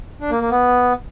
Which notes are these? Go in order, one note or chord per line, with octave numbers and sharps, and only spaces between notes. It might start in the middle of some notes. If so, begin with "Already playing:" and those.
D4
A#3
A#3
B3